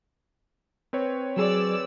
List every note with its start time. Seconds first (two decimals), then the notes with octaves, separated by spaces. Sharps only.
0.93 C4 B4 C#5
1.37 F#3 G#4 D5 E6